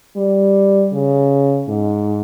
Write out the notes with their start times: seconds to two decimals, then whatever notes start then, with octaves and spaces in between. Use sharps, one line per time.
0.17 G3
0.93 C#3
1.68 G#2